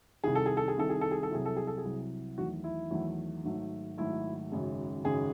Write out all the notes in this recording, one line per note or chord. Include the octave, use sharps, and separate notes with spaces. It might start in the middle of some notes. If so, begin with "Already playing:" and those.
C2 C3 D#3 G#4
A4
G#4
A4
G#4
C2 C3 D#3 A4
G#4
A4
G#4
A4
C2 C3 F#3 G#4
A4
G#4
A4
G#4
C2 C3 F#3
E2 D#3 F#3 A3 F#4
E4
E2 D#3 F#3 A3
G#1 G#2 F#3 A3
G#1 G#2 F#3 A3 E4
G#1 F#2 C#3 G#3
G#1 F#2 C#3 G#3 G#4